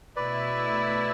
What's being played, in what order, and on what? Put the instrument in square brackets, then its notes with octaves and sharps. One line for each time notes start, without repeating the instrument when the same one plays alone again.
[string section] B2 A3 E4 [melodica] B4 D5